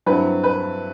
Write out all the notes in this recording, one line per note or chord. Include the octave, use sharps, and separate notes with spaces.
G2 F#3 C4 E4 B4
B4